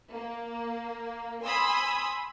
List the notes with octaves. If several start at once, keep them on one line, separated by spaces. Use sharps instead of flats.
A#3
G#5 B5 C6 D#6 E6